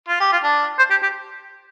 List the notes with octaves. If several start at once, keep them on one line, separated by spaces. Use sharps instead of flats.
F4
G4
F4
D4
C5
G4
G4